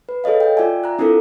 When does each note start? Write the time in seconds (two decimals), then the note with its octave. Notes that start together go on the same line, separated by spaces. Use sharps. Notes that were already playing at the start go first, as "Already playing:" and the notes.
0.09 B4
0.24 G#4 A4 C#5 D#5 F5
0.40 G5
0.57 F4 D5 E5 G#5
0.84 A#5 F#6
0.99 C4 D4 E4 F4 A4 A#4